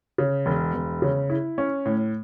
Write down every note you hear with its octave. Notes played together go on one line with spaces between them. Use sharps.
C#3
E1
E1
C#3
E4
C#4
A2